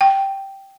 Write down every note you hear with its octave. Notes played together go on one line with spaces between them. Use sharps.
G5